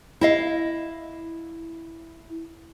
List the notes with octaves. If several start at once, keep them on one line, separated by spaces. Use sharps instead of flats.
E4 D#5 F5